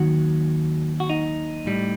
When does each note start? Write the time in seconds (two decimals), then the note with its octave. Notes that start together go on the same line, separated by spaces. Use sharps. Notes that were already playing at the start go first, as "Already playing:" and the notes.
Already playing: D#2 D#3 F#3 F#4
1.00 F#4
1.09 D#4
1.66 A2 G3